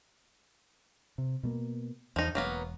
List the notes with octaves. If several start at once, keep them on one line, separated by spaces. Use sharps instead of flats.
C3
B2 A3 A#3
E2 F3 D#4
E1 F#3 A#3 B3